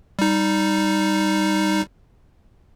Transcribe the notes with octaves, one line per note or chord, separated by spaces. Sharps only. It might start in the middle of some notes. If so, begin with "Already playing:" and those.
G3 D#4